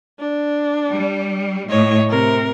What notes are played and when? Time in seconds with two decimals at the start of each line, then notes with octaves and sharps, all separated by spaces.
0.19 D4
0.90 G3
1.69 A2 C#5 D#5
2.09 C3 A#4